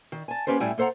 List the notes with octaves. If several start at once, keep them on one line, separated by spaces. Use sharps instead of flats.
D#3
G#5 A5
A#3 C#4 G4 B4 C5
A2 G3 E4 G5 G#5
A#3 A4 C5 F#5 A#5